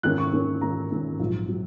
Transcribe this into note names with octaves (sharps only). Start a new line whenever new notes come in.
G#2 D#3 A#3 C#4 F#6
C#6
G#2 D#3 A#3 C#4
G#2 D#3 A#3 C#4 A#5
G#2 D#3 A#3 C#4
A#1 G#2 F#3
F#3